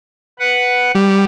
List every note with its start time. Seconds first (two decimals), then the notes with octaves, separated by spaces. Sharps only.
0.39 B4 F#5
0.95 G3